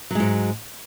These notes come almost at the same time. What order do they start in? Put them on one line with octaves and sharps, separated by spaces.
F#3 G#3 G#2